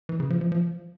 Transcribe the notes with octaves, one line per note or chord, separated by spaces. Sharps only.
E3
C#3
F3
F3
F3